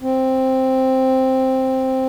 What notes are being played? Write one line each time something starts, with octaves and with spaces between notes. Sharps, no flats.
C4